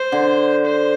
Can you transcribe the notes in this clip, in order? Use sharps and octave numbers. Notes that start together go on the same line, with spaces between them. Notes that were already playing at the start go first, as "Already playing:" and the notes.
Already playing: C5
D3
C5